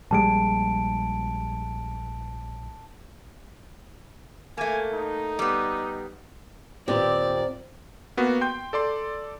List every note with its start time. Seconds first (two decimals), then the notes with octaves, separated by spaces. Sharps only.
0.11 A#1 G3 G#3 A5 D7
4.58 A3 A#3 G#5
4.93 D#4
5.39 G3 B3
6.88 D#2 A#2 C4 G4 D5
8.17 A#3 B3 F#4
8.41 G5 C6 G6
8.73 A4 D5 C6